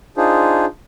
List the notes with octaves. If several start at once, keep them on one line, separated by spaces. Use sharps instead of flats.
D4 D#4 F4 G#4 C5